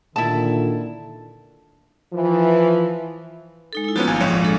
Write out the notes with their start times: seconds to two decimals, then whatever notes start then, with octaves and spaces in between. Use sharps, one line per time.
0.16 A#2 D3 D#3 E4 A5
2.13 E3 F3
3.73 G#3 D#4 A4
3.84 D#4 E4
3.96 F3 A#3 B3 C#4 F#4
4.07 G#1 F5 G#5
4.21 A#1 F2 G#2 C#5
4.40 G#3 D4 A4